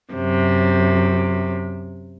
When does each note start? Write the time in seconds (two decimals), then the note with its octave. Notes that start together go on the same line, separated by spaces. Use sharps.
0.12 F#2 C3